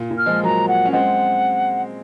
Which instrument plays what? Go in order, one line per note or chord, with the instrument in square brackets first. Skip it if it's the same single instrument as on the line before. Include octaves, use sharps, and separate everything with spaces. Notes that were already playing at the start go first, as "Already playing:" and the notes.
Already playing: [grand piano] A#2
A#2
[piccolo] F6
[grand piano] F3 G#3
[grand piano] F#3 A#3 [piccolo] A#5
[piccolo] F#5
[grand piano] C#4
[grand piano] G#3 C4 [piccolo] F#5